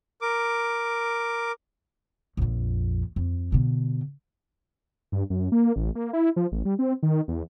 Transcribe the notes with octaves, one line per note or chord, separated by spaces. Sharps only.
A#4 D6
A#1 F2
F2
B2 D3
G2
F#2
A#3
A1
A#3
E4
F3
A1
G3
C4
D#3
E2